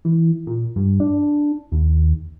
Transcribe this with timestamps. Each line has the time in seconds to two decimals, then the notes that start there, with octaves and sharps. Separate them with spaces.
0.05 E3
0.47 A#2
0.76 G2
1.00 D4
1.72 D#2